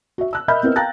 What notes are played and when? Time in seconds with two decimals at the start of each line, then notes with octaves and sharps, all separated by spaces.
0.18 F#4 E5
0.33 E6 F#6
0.48 A#4 D#5 E5 B5 F6 G6
0.63 B3 C4 E4 A#4 B4 D#5
0.76 F5 G5 A#5 F#6 A6 A#6